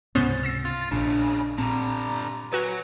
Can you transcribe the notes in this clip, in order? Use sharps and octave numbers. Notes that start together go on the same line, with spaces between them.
C#2 G#2 C3 B3 C#4 C5 A6
E6 A#6 C7
F4
A#1 D#2 A#2 C#3 D4
A#2 D3 G3 C4 A#5
F#3 F#4 B4 G#5